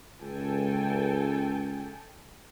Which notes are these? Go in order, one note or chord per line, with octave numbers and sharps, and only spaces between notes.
C#2 A4 G5 G#5